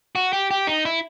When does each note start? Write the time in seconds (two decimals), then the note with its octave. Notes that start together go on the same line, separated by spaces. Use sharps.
0.15 F#4
0.33 G4
0.51 G4
0.67 D#4
0.85 E4